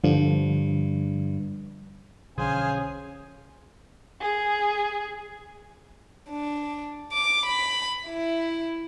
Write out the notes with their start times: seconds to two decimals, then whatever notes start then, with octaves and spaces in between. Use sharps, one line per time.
0.04 G2 D3 F3
2.38 B1 D3 F3 C#4 G#4 C5 F5 G#5
4.21 G#4
6.30 D4
7.12 D6
7.46 B5
8.07 E4